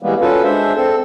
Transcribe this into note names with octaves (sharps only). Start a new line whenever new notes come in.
E3 G3 G#3 A#3 B3
C#4 F4 F#4 A4 B4
G#3 D4 C5 E5
C4 A4